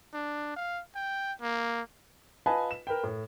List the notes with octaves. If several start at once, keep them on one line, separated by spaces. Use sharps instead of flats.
D4
F5
G5
A#3
F4 B4 D#5 G#5 A5
E7
A#4 B4 G5
A2